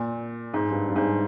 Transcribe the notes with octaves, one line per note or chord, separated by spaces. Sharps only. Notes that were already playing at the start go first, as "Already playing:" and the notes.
Already playing: A#2
G#2
G2
G2
G#2